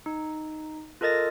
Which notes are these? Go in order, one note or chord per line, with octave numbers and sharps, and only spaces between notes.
D#4
F4 A4 A#4 D#5 A6 A#6